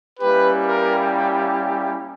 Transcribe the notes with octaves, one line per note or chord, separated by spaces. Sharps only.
G3 A#3 C#4 E4 G4 B4
A#4